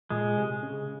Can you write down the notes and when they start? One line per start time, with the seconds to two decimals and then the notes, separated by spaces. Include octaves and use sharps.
0.10 A#2 G#3
0.37 C3
0.62 C#3